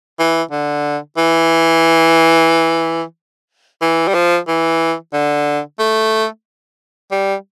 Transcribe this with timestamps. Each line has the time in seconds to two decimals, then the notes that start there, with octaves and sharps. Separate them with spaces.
0.19 E3
0.51 D3
1.17 E3
3.82 E3
4.08 G3
4.14 F3
4.48 E3
5.13 D3
5.79 A3
7.12 G3